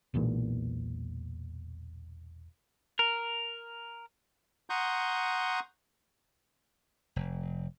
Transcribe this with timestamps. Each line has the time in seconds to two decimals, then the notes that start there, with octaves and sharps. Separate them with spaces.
0.14 E1 B1 E2 A#2
2.99 A#4
4.70 F#5 A#5 C6 C#6 D#6 G6
7.16 F1